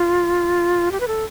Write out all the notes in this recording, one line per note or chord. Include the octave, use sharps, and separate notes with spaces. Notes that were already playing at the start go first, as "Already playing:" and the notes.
Already playing: F4
G4
B4
A4